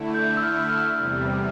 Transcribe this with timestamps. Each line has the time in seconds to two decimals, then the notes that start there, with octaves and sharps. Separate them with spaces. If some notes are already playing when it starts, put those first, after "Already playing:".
Already playing: D3 A3 E4
0.14 G6
0.37 E6
0.43 F6
0.69 F6
0.97 E2 C3 G3